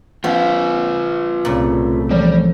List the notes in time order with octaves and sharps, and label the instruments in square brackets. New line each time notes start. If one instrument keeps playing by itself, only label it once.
[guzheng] F3 [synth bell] A#3 C4 [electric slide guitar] F4 B4
[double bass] C2 A3 [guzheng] A#2 C#3
[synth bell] E3 F3 D5 [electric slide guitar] G3